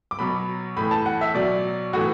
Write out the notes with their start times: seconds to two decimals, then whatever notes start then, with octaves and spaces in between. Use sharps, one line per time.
0.11 D6
0.19 B2 F#3 B5
0.77 A2 E3 B5
0.91 A5
1.06 F#5
1.21 E5
1.35 B2 F#3 D5
1.93 A2 E3 F#4